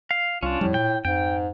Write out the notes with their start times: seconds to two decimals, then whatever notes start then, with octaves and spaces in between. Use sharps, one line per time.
0.11 F5
0.43 C2 C#4 D4 F4
0.61 F2 A2 F3 G3
0.74 A#2 G5
1.05 F2 G#2 G5